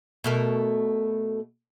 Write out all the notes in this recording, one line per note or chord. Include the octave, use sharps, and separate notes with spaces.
B2 A3 A#4